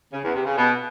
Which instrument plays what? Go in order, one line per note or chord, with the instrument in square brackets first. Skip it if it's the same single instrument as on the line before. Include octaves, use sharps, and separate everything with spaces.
[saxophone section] C#3
E2
C3
C#3
B2